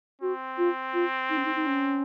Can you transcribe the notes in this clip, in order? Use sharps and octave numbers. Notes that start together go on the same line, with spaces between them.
C4 F#4
F4
F4
D#4
C#4
D#4
D#4
C#4